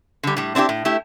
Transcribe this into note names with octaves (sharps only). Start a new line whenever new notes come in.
D3 G3
A2 G3
C4 D4 E4 F4 G4
A2
A3 E4 G4